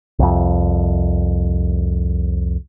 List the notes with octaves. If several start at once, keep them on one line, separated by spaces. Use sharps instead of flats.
C2 F2